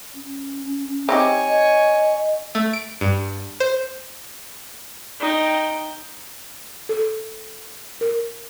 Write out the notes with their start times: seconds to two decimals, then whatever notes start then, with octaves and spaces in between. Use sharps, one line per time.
0.14 C#4
1.09 C4 D#4 G4 C#5 G#5
1.47 D#5
2.55 A3
2.73 D7
3.01 G2
3.60 C5
5.20 D#4 G5
6.89 A4
8.01 A#4